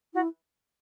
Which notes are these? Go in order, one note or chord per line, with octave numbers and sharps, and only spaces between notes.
E4 F#4